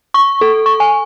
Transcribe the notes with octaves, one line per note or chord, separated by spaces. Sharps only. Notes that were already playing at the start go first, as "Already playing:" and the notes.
C#6
A4
C#6
G#5